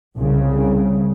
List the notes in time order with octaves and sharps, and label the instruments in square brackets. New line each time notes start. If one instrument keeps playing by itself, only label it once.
[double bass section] C2 C#3